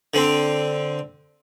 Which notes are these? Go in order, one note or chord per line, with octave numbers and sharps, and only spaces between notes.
D3 C4